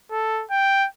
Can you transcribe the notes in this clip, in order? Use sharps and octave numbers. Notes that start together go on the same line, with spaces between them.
A4
G5